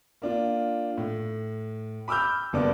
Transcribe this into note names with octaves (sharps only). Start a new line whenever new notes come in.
A#3 D4 F4
A2
B5 D6 E6 F6 G6
F#1 G2 B3 D4 D6